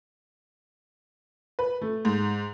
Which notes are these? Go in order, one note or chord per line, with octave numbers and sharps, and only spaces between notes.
B4
A3
G#2